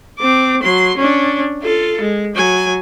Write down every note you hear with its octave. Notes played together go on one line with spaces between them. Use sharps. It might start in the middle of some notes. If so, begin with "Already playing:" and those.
C4 D6
F#3 C6
C#4 D4
F4 A4
G#3
F#3 G#5